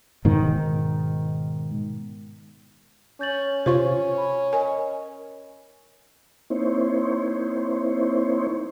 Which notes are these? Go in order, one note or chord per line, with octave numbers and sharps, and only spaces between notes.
G#2 B2 D#3
C#4 G6 A6 F#7
C3 F4 C5 C#6
B5
A#4 D#5 G#5
A#3 C4 D#4 E4 C5 C#5